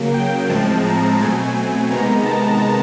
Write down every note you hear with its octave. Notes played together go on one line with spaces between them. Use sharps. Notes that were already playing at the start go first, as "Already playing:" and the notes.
Already playing: C#3 F#3 A#3
G5
A2 F3 G#3 C4 A5
A#5
B2 F#3 A3 C4 G#5
G#5
C3 D#3 G#3 B3 A#5
A5